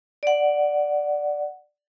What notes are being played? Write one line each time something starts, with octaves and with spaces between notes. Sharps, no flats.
D5 F#5